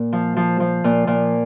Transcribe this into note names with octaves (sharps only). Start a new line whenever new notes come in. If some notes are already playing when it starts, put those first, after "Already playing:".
Already playing: A#2
F3
F3
F3
A#2
A#2